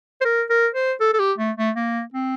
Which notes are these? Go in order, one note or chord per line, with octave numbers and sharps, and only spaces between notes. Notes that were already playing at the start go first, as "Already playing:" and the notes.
C5
A#4
A#4
C5
A4
A4
G4
A3
A3
A#3
C4